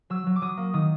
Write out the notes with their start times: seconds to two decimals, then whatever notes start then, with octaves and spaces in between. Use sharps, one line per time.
0.10 F#3 E6
0.26 F#3
0.36 D6
0.41 F#3 D#6
0.57 A#3
0.73 D#3 D#6